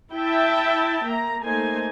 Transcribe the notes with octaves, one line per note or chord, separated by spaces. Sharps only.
E4 E5 G5 A5
A#3 A#5
A3 A#3 D#4 C5 G#5